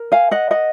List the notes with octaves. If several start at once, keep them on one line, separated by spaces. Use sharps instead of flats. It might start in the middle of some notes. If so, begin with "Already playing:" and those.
Already playing: A#4
F5 G#5
D#5 F#5
D#5 F#5